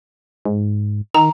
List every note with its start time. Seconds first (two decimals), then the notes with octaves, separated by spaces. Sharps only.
0.45 G#2
1.15 D#3 A#5